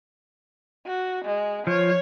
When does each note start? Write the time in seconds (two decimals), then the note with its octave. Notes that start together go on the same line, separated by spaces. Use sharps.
0.86 F#4
1.25 G#3
1.67 F3 C#5